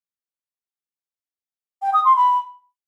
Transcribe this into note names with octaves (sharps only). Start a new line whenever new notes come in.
G5
D#6
C6
B5